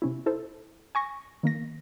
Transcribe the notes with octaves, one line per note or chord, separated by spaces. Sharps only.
C3 C#4 E4
E4 A4 C5
G#5 C#6 A#6
D#3 A#3 A#6